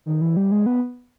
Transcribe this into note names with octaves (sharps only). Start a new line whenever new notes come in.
D#3
E3
G3
G#3
B3